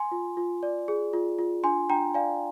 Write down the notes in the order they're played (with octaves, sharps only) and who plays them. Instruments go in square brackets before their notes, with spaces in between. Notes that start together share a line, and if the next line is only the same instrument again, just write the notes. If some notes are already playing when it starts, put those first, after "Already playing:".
Already playing: [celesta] G#5 C6
F4
F4
D5
G#4
F4
F4
D4 G#5 C6
D4 G5 A#5
D5 F5 G#5